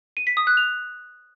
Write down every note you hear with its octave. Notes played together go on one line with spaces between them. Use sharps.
D#7
B6
D#6
F#6
F7